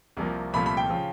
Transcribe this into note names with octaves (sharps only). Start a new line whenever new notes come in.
C2 C3 F3 A#3
C2 A#2 F3 A3 B5
B5
G5
C#3 F3